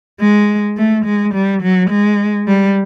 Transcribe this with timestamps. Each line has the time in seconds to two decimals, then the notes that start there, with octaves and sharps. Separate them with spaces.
0.20 G#3
0.77 A3
1.05 G#3
1.34 G3
1.62 F#3
1.90 G#3
2.47 G3